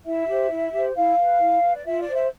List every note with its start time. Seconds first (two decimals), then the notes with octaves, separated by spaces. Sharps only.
0.06 E4 E5
0.28 G4 C5
0.51 E4
0.73 G4 C5
0.95 E4 F5
1.18 B4
1.40 E4
1.62 B4
1.74 D5
1.85 F4 E5
2.00 D5
2.07 C5
2.15 E5